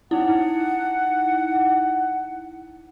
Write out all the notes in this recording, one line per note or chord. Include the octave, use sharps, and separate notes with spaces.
D#4 E4 F#5